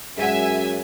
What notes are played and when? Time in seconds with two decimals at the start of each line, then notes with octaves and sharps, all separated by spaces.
0.18 F#2 G#3 E5 F#5 G#5